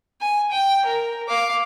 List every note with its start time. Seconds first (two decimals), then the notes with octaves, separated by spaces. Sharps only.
0.21 G#5
0.51 G5
0.85 A#4
1.29 F5 D6